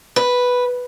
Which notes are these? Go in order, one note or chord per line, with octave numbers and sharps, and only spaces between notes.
B4